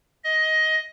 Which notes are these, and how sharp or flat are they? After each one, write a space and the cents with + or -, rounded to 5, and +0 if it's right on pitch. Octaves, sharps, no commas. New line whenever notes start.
D#5 +15